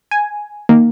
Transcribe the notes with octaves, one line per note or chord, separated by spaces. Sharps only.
G#5
D#3 A#3